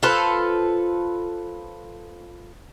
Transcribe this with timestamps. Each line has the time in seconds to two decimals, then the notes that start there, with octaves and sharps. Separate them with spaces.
0.03 F4 A4 B4 C5